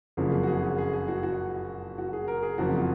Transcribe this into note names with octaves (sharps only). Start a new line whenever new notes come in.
F#1 F2 C#3 F3 G#4
G#4
F#4
G#4
G#4
G#4
G#4
F#4
F#4
F#4
G#4
A#4
G#4
F#1 F2 C#3 F3 F#4
F4